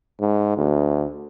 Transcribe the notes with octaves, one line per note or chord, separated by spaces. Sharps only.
G#2
D2